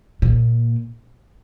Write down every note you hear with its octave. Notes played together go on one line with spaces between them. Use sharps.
A#2